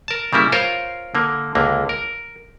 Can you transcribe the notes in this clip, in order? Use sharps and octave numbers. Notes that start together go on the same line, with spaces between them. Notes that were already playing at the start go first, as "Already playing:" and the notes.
A#4 A5
C#3 G3 A#3 E4
F4 A#4 C5 C#5 F5
D3 A#3
C#2 D3 A#3
A#4